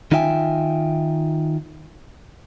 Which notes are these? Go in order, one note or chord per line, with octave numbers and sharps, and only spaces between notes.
D#3 D#4 F4 E5 G5 G#5